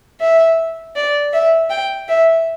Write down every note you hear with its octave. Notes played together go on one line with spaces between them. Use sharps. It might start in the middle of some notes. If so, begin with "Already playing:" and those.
E5
D5
E5
G5
E5